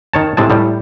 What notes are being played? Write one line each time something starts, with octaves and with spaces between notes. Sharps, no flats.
D#3 C#5 A5
A2 C3 G#3 A5
A2 G3